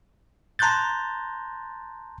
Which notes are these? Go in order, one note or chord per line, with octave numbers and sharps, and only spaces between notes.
A5 A#5 C6 F#6 G6 A6